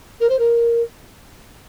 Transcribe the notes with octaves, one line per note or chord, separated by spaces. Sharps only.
A#4
C5
A#4